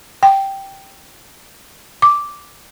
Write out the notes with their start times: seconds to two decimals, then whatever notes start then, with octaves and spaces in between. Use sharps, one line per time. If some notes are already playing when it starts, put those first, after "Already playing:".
0.23 G5
2.02 D6